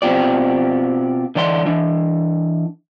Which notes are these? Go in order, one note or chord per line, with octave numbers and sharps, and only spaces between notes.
B2 C4 D4 F4 G4 D5
D3 E3 D5 G5 C6
E3 D4